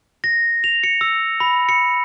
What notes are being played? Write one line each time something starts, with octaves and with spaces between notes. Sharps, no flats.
A#6
F7
C#7
E6
B5
C#7